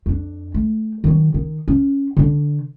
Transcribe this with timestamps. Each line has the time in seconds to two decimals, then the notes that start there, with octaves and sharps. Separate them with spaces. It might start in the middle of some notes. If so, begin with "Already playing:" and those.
0.06 F2 D4
0.54 A3
1.04 D#3 F#3
1.34 D#3
1.68 C#4
2.17 D3 D4